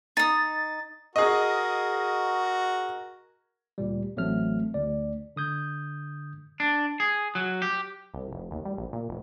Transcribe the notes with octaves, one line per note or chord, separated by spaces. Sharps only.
D#4 D#6 A6
F#4 G#4 A#4 D#5
D2 A#2 G3
A1 F#3 A3 C4 F6
D2 D5
D3 D#6 G6 G#6
D4
G#4
F#3
G4
C2
F1
D#2
G3
A#1
A#2
F1